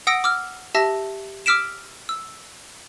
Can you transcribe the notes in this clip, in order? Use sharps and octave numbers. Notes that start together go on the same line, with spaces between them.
F#5 D#6 E6 A#6 D7
D6 E6 F6
G4 E5 A5 E6 A#6
D6 E6 F6 B6 D7 E7
E6